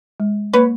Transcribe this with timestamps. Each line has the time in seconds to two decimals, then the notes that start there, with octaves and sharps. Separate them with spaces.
0.20 G#3
0.53 A#3 B4 C#5